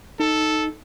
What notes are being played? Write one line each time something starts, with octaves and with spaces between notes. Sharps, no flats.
D#4 A4